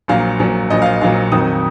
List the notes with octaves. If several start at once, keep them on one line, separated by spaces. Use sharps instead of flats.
A#1 A#2 F#3 F5
A#1 A#2 F#3
A#1 A#2 F#3 D#5
F5
D#5
A#1 A#2 F#3 F5
F2 D#3 F#3 D#6